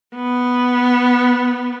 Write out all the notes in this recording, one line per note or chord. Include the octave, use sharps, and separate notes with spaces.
B3